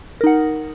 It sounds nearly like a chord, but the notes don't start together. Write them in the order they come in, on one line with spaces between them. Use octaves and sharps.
A#4 D#4 F#5